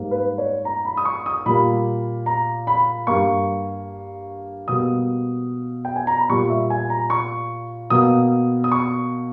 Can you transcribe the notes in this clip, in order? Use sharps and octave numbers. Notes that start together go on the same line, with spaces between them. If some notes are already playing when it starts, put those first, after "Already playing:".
Already playing: G#2 G3 A#3
B4
C#5
A#5
B5
D#6
C#6
D#6
A#2 G3 A#3 B5
A#5
B5
G2 G3 A#3 C#6
B2 G3 A#3 D#6
G5
G#5
A#5
B5
A#2 G3 A#3 C#6
E5
G#5
A#5
C#6
B2 A#3 D#6
D#6
C#6